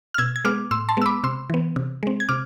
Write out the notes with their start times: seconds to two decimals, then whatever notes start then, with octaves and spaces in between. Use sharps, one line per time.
0.14 F6
0.18 B2 E6 G#6
0.36 G#6
0.45 G#3 B3 D6 F6
0.71 A2 C6 E6
0.89 A5 C6
0.97 G#3 B3 E6
1.06 B5 D6
1.24 C3 C6 E6
1.50 E3 B3
1.76 C3
2.03 G#3 C4
2.20 G#6
2.29 C3 D6 F6